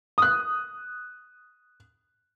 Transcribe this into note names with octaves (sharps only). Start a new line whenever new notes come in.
D#6 F#6